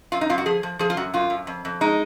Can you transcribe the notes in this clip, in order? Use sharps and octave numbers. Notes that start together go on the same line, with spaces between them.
F#2 F4
D#4
F#2 F4
F#4
F3 G#4
F3
F3 G#4
F4
F#2 F#4
F#2 F4
F#2
F2
F2
G#3 D#4